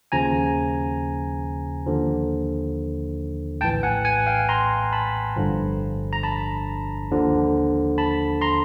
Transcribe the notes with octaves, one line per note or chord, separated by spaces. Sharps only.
D#2 C#3 F3 G#5 A#5
D#2 D3 F3
A#1 A2 E3 G5 A5
F#5 G#5
F#5 G#5
F5 G5
A#5 C6
A5 B5
G1 G2 D3 F3
A#5
A5 B5
D#2 D3 F3
A5 B5
A#5 C6